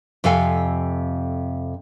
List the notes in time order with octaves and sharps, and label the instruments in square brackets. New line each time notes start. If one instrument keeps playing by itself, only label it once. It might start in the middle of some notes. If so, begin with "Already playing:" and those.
[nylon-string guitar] F2 C3 A4 F5 G#5